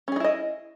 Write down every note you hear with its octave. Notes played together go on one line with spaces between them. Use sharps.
C#4 D#4 E4 G#4 D#5